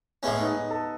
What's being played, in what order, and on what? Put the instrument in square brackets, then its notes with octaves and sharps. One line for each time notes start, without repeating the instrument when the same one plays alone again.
[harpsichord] A2 G#3 C#4 [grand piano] B3 B4
[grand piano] D#4 D#5
D#4 D#5
A4 A5